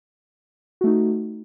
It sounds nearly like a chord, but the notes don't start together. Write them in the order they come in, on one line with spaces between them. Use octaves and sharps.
F#4 A3 D#4